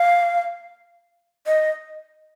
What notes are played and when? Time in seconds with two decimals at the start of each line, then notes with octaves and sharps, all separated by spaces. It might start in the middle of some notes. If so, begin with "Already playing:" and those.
Already playing: F5
1.47 D#5